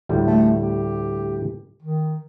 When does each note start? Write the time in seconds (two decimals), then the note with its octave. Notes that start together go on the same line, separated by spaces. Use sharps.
0.09 D2 A2 G3
0.27 A3
0.60 G4
1.82 D#3